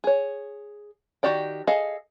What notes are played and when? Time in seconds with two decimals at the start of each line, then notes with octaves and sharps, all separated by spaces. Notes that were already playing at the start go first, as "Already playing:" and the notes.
0.04 G#4 C#5
1.23 D#3 F#4 G4 D5 G5
1.67 G#4 A4 D#5 F5